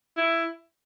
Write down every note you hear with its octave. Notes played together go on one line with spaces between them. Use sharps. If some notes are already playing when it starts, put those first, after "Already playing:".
E4